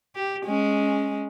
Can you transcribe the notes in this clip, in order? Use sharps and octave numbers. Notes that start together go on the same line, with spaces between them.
G4
G#3 C#4